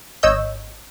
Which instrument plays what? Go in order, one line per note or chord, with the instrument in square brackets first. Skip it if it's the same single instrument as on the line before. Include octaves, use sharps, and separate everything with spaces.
[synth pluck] G#1 C#5 D#5 E6 G6